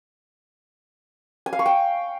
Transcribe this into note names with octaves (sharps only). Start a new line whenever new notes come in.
G#5
F5
C#6
G5